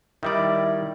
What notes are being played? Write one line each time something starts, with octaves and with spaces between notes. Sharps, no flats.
D#3 G3 E4 D5